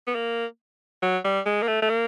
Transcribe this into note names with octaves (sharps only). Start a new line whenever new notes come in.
B3
A#3
F#3
G3
G#3
A#3
A3
A3
A#3